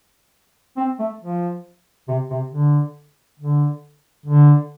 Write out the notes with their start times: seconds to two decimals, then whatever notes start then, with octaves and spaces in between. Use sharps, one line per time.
0.77 C4
0.99 A3
1.21 F3
2.08 C3
2.31 C3
2.52 D3
3.40 D3
4.26 D3